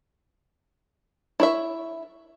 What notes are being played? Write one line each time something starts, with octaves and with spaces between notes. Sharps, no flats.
E4 C#5 E5